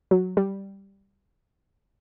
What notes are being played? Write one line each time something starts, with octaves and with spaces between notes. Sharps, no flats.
F#3
G3